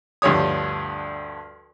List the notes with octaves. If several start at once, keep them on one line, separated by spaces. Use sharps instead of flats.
D2 G2 F3 C#5 D#6